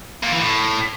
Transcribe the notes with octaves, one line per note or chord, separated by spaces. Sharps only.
A#2
E3
A2